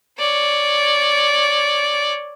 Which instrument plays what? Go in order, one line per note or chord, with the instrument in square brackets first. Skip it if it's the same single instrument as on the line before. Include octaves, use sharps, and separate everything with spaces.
[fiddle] C#5 D5